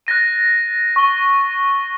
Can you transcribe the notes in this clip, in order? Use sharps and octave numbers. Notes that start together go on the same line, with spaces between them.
F#6 A6 A#6 D#7
C#6 G7